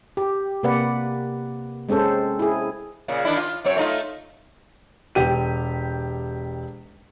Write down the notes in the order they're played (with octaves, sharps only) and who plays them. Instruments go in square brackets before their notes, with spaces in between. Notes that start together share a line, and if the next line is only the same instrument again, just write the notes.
[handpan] G4
C3 A#3 B4 D5 F#5
G#3 C4 C#4 A4 C5
E4 G#4
[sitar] A#2 C#3
D#3 D4 E4
F4
F#2 C4 C#5
A3 D#4 F4
[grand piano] E1 G4 D#7